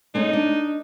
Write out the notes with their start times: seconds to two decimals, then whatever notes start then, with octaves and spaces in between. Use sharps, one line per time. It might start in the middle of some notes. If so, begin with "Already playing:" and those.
0.15 G#3 A3 C#4 D#4
0.33 D4